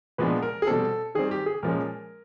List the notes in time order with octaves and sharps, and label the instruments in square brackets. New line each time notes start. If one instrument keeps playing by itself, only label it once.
[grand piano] A#2 F3 G#3 B3 D4 B4
A#4
G#4
B2 G3 C4 A4
D#3 G3 C4 G#4
G4
G#4
A#2 F3 G#3 C#4 A#4